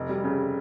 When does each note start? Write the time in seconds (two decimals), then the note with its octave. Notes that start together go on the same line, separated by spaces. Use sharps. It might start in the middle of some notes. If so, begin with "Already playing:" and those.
Already playing: F1
0.09 G3
0.24 C#3